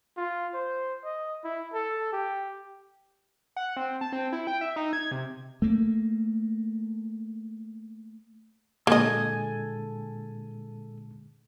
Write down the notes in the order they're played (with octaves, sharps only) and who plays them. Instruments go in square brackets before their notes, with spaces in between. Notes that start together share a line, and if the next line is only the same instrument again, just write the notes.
[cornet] F4
C5
D#5
E4
A4
G4
[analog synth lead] F#5
C4
A5
C4
E4
G5
E5
D#4
G#6
C3
[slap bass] A3 A#3
[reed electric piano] A#2 D3 G#3 [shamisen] A#3 D#5 [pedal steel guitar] A4 G#5